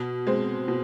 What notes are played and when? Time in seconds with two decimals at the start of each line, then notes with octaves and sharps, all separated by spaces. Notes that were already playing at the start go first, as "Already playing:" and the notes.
Already playing: B2
0.27 G#3 C4
0.68 B2